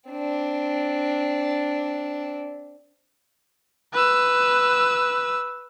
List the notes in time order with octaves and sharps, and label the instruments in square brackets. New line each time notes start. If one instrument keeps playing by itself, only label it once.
[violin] C4 D4
[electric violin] B4 E6